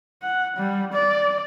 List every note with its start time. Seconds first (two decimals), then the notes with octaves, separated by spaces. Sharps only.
0.22 F#5
0.57 G3
0.93 D5